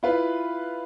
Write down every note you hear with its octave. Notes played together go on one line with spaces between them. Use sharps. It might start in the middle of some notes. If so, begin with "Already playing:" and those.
E4 F4 B4